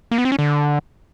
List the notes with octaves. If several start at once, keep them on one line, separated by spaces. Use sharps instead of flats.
A#3
B3
C4
C#4
D3